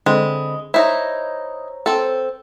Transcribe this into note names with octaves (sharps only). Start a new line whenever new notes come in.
D3 G#3 C4 B5
D#4 E4 C5 C#5 A#5
C4 A4